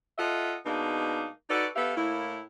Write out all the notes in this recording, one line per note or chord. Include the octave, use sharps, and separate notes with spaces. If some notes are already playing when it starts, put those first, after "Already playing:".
F4 A4 D#5 E5 F#5
B2 G#3 A#3 D4 D#4
D#4 F#4 A4 B4 D5
B3 G4 A4 E5 F5
A2 A#3 E4